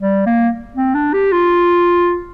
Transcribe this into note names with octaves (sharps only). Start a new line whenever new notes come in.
G3
A#3
C4
D4
G4
F4